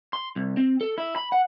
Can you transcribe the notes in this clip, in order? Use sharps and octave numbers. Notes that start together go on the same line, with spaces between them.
C6
C2
C4
A4
E4
B5
F#5